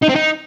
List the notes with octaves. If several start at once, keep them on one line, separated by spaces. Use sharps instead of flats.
D#4
C4
D#4